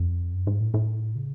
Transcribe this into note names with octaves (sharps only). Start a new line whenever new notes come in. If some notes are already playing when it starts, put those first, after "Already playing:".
Already playing: F2
F#2
G#2
A2
A2
C#3